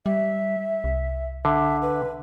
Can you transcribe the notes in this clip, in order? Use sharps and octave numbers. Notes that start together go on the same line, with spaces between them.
G3 E5
C2
D3 E5
B4